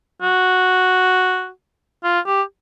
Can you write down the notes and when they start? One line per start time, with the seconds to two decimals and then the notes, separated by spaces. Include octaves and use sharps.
0.22 F#4
2.04 F4
2.26 G4